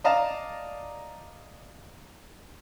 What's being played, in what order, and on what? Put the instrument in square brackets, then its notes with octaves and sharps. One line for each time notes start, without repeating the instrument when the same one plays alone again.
[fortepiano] D5 D#5 F5 A5 A#5